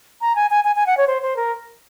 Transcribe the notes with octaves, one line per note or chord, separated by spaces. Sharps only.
A#5
G#5
G#5
G#5
G#5
F#5
C#5
C5
C5
A#4